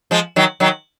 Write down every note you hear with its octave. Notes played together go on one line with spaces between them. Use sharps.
F3 G#3
D#3 F#3
D#3 F#3